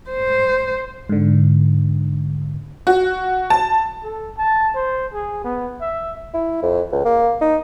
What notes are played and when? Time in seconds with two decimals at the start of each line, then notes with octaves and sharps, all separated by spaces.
0.10 C5
1.09 G#2 D3
2.87 F#4
3.50 A5
4.03 A4
4.38 A5
4.75 C5
5.13 G#4
5.44 B3
5.81 E5
6.34 E4
6.62 F2
6.92 C#2
7.05 A#3
7.41 D#4